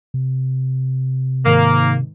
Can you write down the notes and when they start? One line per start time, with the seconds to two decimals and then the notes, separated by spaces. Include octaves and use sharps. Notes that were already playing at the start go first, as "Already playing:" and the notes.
0.14 C3
1.46 G#2 D#3 A#3